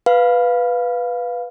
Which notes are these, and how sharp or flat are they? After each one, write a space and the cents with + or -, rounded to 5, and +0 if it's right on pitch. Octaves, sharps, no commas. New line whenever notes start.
B4 +0 F5 +5